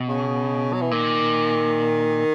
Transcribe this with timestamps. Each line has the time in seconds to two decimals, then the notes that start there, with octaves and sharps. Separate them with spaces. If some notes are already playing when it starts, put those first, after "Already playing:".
Already playing: B2
0.08 C#3
0.73 F#3
0.81 E3
0.91 A#2 D#3